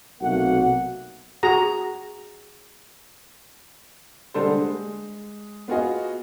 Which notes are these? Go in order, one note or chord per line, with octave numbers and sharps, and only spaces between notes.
B1 C3 A3 A#3 F#4 F#5
F#4 G#4 A#5
D3 G3 G#3 A4 C5
G#3
B3 F4 F#4 G#4 D#5